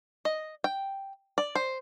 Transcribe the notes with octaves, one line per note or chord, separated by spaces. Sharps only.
D#5
G5
D5
C5